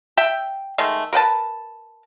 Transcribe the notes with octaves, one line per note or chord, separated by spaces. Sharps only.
E5 G5
D#3 G#3 A3
A#4 B4 G5 A5